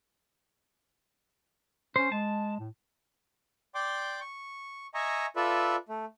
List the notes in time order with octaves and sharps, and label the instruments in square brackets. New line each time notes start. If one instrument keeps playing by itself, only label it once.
[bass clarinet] C#4 [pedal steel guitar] C5
[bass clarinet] G#3 [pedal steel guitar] A5
[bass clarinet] A2
[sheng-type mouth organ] D5 G5 C6 D6
C#6
D#5 E5 G#5 A#5 C#6
F4 A4 B4 D5 E5
A3